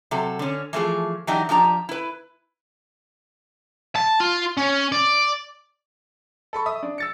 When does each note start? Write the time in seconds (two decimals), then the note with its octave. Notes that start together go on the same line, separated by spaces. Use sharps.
0.11 C3 F#3 A4
0.39 D3 C#4
0.73 E3 F3 A3 G#4
1.27 E3 F#3 D4 D#4 G4
1.49 F3 D4 G4 A#5
1.89 E4 B4
3.96 A5
4.20 F4
4.58 C#4
4.92 D5
6.53 A4 B5 C#6
6.66 E5 D#6
6.83 D4
6.98 E6 A6 C#7